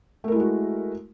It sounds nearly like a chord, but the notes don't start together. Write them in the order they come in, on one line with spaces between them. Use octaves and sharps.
A3 A#4 E4 G#3 F#4